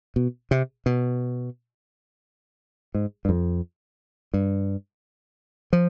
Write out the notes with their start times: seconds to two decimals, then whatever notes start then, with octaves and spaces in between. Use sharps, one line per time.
0.16 B2
0.51 C3
0.86 B2
2.95 G#2
3.25 G2
3.29 F2
4.34 G2
5.73 F3